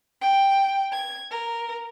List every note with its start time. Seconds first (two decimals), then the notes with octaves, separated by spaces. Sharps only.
0.21 G5
0.93 G#6
1.31 A#4